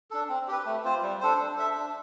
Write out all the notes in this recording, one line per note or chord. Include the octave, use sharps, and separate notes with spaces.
D4 A4
C4
G4 B4
A3
C4 F4 C5
G3
D4 A4 C5
D4
A4 E5
D4